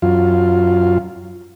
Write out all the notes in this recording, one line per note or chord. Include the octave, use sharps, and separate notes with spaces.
F#2 F4